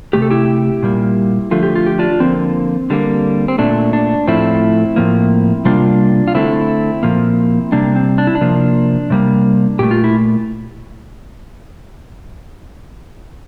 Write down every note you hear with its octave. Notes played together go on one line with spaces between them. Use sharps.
C3 F3 A3 G4
A4
E4 G4
A#2 G3 A#3
D3 F3 A3 F4
G4
F4
G4
D4 F4
D3 F3 A#3 C4
D3 G3 A#3
C4
A#2 A3 D4
D4
A2 F3 A3 C4 E4
A2 F3 A#3
C3 G3 A#3 D4 F4
F4
D3 A3 C4 E4
A#2 F3 A#3
C3 G3 A#3 D4
C4
D4
E4
D4
C3 F3 A#3
C3 G3 A#3
A#2 A3 G4
F4
E4